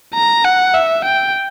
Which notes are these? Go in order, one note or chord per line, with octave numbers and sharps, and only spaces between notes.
A#5
F#5
E5
G5